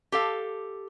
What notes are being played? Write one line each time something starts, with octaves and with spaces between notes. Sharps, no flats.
G4 A4 F5